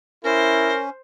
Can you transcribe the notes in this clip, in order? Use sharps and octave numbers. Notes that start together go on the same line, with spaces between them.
C#4 E4 A#4 C5